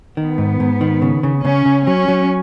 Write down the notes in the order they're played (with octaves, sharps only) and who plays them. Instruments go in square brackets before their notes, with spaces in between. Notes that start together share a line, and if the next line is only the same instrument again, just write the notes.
[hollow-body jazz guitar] D#3 [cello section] B3
[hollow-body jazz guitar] G#2
G#2
D#3
C#3
C#3
[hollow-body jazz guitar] C#3 [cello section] C#4
[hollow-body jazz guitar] C#3
[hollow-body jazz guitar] F#3 [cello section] C#4
[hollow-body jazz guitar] F#3